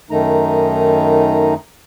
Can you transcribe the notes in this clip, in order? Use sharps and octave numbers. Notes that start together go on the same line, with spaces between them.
F#2 D#3 A3 D#4 A#5